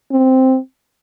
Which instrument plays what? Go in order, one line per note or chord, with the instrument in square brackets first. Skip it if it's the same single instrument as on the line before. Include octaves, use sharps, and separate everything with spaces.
[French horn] C4